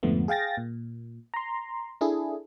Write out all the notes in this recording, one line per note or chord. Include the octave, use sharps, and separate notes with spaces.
F2 G#2 D3 F3 A3 B3
G#4 F5 G5 A6 A#6
A#2
A#5 C6
D4 E4 G#4 A4